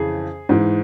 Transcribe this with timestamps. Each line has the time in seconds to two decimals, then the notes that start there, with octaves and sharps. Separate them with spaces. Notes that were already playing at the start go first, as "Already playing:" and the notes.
Already playing: F2 C#3 E3 G#4
0.49 G#2 E3